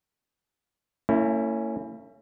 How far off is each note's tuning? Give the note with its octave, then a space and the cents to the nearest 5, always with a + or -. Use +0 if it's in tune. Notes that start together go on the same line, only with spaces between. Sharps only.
A#3 -45 C#4 +0 E4 +0